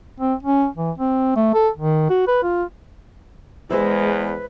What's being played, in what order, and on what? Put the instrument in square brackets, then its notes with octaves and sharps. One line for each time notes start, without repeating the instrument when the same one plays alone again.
[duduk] C4
C#4
E3
C4
A3
A4
D#3
F#4
B4
F4
[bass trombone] E2 [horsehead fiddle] G#3 [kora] E4 C5 E5 [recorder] B4